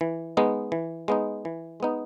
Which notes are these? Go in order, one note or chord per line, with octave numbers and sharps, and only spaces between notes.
E3
G#3 B3 D#4
E3
G#3 B3 D#4
E3
G#3 B3 D#4